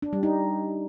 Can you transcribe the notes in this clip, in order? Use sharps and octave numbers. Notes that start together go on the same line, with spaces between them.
D4
G3
D#4